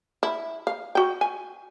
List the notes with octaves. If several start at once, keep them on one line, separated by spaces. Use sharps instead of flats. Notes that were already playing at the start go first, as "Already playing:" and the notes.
E4
F5
F#4 G5
G#5